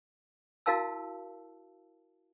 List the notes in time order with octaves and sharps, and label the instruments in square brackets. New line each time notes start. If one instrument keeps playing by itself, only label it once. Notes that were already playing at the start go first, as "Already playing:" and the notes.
[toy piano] E4 F#4 A#4 F5 A5 E6